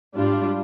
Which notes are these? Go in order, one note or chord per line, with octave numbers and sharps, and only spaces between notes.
G#2 G3 D4 F4